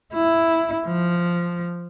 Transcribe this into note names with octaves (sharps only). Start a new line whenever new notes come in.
E4
F3